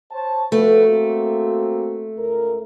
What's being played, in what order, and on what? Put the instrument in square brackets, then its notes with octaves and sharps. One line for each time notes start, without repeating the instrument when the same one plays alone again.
[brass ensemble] C5 C#5 A5
[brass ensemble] F3 F#4 B4 [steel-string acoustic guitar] A3
[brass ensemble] A#3 C4 F#4
C#2 A#4